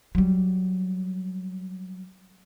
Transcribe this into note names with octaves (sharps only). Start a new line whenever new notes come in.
F#3 G3